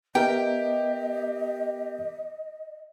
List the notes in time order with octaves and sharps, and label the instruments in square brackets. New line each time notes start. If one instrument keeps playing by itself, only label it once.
[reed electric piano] B3 A#4 E5 [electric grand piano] G4 [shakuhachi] D#5 [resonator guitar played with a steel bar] G5